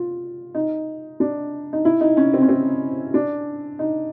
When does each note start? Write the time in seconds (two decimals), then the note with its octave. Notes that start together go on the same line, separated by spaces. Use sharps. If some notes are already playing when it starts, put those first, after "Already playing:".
Already playing: F4
0.55 D#4
1.20 D4
1.73 D#4
1.85 E4
2.01 D#4
2.17 C#4
2.34 C4
2.42 C#4
2.49 C4
3.14 D4
3.79 D#4